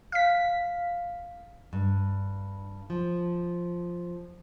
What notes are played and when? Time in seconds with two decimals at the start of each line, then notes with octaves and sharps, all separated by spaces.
0.12 F5 B6
1.73 G2
2.90 F3